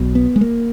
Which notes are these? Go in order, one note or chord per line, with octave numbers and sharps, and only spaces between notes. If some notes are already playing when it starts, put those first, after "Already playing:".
Already playing: B1 B2
B3
G#3
A#3